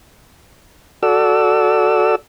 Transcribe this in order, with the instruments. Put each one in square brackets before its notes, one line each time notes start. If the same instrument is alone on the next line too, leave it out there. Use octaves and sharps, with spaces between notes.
[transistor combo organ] F#4 A4 D5 E6